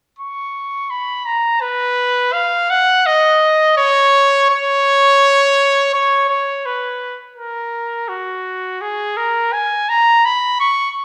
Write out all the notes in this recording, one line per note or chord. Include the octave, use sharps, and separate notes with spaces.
C#6
B5
A#5
B4
F5
F#5
D#5
C#5
C#5
C#5
C#5
B4
A#4
F#4
G#4
A#4
G#5
A#5
B5
C#6